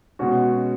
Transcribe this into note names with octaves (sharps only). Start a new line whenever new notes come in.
B2 G#3 C#4 F#4